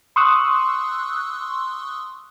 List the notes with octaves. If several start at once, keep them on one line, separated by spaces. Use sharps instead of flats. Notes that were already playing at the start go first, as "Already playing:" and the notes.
C6 C#6 D#6 E6 F#6